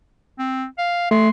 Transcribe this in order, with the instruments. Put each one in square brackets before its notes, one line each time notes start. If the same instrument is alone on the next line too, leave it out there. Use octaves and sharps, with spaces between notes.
[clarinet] C4
F5
[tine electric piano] A3 [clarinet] C6